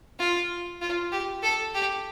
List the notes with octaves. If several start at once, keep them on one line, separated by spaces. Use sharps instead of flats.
F4
F4
G4
A4
G4